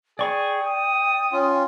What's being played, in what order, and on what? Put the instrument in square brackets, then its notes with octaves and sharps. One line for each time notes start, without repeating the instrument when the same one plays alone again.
[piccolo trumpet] G#4 [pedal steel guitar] D5 C#6 [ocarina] G5
[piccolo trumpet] D#6
[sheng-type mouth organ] C#4 F4